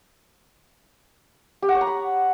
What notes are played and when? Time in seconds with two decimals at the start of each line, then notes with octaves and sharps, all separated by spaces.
1.62 G4
1.69 F#5
1.75 C#5
1.81 A#5
1.87 B5